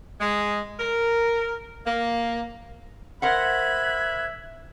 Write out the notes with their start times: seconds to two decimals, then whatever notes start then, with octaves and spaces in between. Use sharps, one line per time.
0.20 G#3
0.79 A#4
1.86 A#3
3.22 A#4 C5 E5 F#5 B5 F#6 G#6